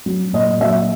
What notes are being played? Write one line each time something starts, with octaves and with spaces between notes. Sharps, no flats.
F#3
A#2 D#5
F#3 E5